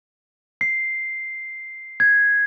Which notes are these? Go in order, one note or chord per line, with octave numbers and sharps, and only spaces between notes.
C7
G#6